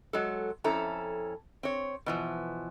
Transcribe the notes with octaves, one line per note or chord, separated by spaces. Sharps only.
F#3 G#3 A4
F2 C#4 E4 A4 A#5
C4 C#5
B2 E3 F3